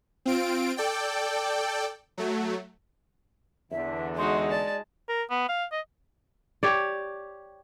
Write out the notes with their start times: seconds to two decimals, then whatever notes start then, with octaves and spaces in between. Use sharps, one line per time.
0.26 C4 F4 D7
0.77 A4 D5 G5
2.18 F#3 A3
3.71 E2 D3 E5
4.18 G#3 D#4 F#4 C6
4.51 D5 A5
5.09 A#4
5.30 B3
5.49 F5
5.72 D#5
6.63 G4 C#5 D5